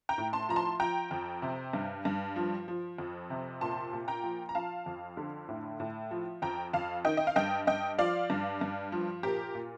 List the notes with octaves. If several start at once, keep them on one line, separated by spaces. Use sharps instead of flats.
G5 A#5
A2
A5 C6
F3 A#5
A5 C6
F3 G5 A#5
F2
C3
G2
G2
F3
F3
F2
C3
A#2 A5 C6
A#2
G5 A#5
F3
A#5
F3 F5 A5
F2
D3
A2
A2
F3
F2 G5 A#5
F2 F5 A5
D#3 D#5 G5
D#5
F5
G2 D#5 G5
G2 D#5 G5
F3 D5 F5
G2
G2
F3
A#2 G4 A#4
A#2